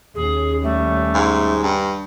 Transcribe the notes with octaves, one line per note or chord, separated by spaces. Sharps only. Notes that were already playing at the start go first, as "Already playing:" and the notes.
D#2 C#4 G#4
G3 A3
G#2
G2